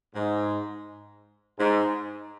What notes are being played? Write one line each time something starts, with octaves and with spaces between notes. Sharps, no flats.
G#2
G#2